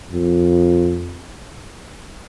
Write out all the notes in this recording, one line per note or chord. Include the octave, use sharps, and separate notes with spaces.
F2